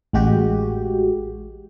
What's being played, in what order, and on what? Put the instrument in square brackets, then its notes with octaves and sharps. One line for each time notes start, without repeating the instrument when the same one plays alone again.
[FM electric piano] A1 G#3 F#4 G4